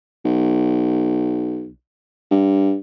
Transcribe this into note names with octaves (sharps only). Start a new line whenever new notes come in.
B1
G2